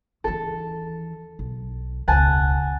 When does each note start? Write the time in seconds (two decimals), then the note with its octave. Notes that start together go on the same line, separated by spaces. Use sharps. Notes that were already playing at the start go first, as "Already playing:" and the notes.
0.24 D#2 E3 A4
1.39 B1
2.08 E1 C#2 F#5 G#5 A5